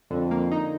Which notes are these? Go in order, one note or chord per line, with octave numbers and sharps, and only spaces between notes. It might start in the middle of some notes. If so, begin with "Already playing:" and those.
F2 D3
A#3
D#4